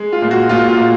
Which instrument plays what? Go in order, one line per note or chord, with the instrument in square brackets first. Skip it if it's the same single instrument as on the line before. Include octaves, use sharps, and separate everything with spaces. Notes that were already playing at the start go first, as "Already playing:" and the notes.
Already playing: [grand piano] G#3
F4
A#2
F#4
A#2 F4
F4
A#2